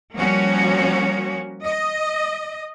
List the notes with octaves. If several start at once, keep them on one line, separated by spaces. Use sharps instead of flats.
F3 G3 A#3 C#4 F#4 C#5
D#5